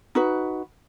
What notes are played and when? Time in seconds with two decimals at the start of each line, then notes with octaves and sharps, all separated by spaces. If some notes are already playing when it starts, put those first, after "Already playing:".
0.15 D#4 F#4 B4